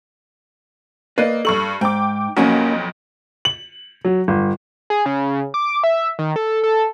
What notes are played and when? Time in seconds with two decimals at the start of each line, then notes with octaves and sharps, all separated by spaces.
1.18 A#3 B4 D5 D#5
1.45 G2 A4 C#6 F#7
1.81 G#2 G5 D6
2.37 B1 F2 A#3 C#4 F#4
3.45 F#7
4.05 F#3
4.28 G1
4.90 G#4
5.06 C#3
5.54 D6
5.84 E5
6.19 D#3
6.36 A4
6.64 A4